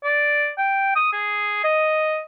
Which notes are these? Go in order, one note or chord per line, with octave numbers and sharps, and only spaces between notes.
D5
G5
D#6
G#4
D#5